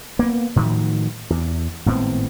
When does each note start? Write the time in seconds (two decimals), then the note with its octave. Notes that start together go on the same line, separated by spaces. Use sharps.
0.19 A#3 B3
0.56 A2 D#3 F3 F#3
1.30 E2
1.86 G#1 A2 B3 C4